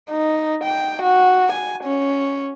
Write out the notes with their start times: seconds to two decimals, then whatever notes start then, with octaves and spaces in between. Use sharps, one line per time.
0.10 D#4
0.64 G5
1.03 F#4
1.53 G#5
1.84 C#4